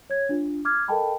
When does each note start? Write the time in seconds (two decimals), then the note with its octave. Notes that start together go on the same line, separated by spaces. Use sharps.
0.10 C#5 G#6
0.29 D4 F4
0.65 D6 F6 G#6
0.88 A4 A#4 D#5 G5 A5 B5